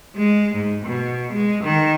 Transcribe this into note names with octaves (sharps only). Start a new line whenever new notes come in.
G#3
G#2
B2
G#3
D#3